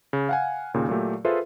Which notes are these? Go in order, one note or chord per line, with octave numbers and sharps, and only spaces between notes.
C#3
F5 F#5 G#5
D#2 A#2 C#3
A#2 F#3 A3 G4
F4 G#4 A4 B4 C5 E5